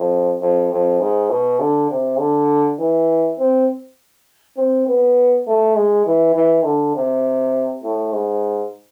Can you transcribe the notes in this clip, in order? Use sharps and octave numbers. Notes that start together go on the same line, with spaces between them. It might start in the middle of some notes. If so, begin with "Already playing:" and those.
Already playing: F2
F2
F2
G#2
B2
D3
C3
D3
E3
C4
C4
B3
A3
G#3
E3
E3
D3
C3
A2
G#2